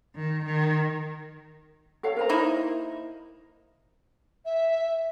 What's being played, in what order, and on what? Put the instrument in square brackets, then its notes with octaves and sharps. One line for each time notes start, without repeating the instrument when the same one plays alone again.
[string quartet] D#3
D#3
[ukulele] A4 C#5 F5
A#4 C5 A#5
[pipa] A#3 D#4 E4
[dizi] E5